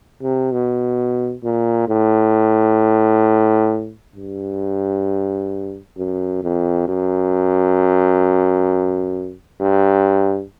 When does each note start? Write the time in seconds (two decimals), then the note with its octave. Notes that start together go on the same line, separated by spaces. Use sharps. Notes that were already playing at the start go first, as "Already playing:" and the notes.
0.22 C3
0.52 B2
1.44 A#2
1.89 A2
4.16 G2
5.98 F#2
6.43 F2
6.88 F#2
9.61 G2